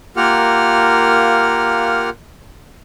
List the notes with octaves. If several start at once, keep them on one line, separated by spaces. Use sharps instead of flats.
A#3 F4 G4 A#4 F#5 F6